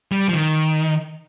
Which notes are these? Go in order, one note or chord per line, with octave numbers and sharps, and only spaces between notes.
G3
F3
D#3